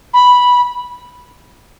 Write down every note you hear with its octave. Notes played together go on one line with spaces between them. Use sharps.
B5